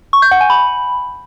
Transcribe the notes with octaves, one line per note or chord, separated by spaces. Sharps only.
C#6
G6
F#5
G#5
B5